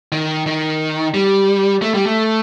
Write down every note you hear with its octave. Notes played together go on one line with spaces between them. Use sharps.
D#3
D#3
G3
A3
G3
A3